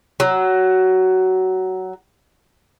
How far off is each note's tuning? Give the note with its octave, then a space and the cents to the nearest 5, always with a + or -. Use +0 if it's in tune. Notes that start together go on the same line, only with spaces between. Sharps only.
F#3 +15